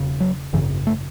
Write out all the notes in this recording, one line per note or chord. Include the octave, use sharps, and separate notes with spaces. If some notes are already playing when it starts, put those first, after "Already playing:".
Already playing: E1 C#3
F#3
G#1 F#2 C#3 E3
A3